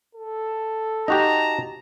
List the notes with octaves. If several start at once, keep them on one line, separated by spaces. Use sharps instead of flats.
A4
D#4 F#4 G4 A5 A#5